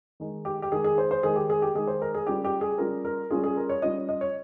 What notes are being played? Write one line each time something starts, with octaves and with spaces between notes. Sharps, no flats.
D#3 G#3 D#4
G4
G4
D#3 G#3 D#4 G#4
G#4
C5
C5
D#3 G#3 D#4 G#4
G4
G#4
G4
D#3 G#3 D#4 G#4
C5
A#4
G#4
G3 C#4 F4 G4
G4
G#4
G3 C#4 F4 A#4
A#4
G3 C#4 F4 G#4
G#4
A#4
C#5
G3 C#4 F4 D#5
D#5
C#5